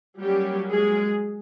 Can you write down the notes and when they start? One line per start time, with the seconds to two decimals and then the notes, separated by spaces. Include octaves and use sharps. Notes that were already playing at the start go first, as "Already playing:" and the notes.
0.19 F#3 G3 A#3 C#4 G4
0.71 G#3 G#4